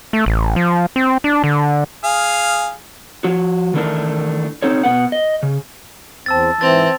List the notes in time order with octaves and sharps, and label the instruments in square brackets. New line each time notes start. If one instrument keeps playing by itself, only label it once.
[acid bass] A3
A1
F3
C4
D4
D3
[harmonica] G#4 F5
[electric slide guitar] F3 F#4
D#3 E3 A3 D4 E4 A#4
C4 D#4 A4 C#5
B2 B3 B4 F#5
D#5
C#3
[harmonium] E2 C4 [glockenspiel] A5 E6 A6
[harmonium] G#2 [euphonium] E3 [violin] C4 [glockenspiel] A6 F7